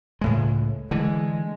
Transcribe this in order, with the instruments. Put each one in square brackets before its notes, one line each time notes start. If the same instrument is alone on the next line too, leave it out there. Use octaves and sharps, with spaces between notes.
[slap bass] C#2 A2 G#3
[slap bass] D3 E3 [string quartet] G#3